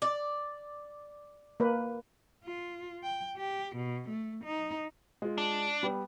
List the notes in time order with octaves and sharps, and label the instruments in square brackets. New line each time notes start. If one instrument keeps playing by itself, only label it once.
[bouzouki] D5
[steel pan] A#3 B4
[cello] F4
G5
G4
B2
A3
D#4
[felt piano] G#3 F4
[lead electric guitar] D4
[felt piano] G3 B3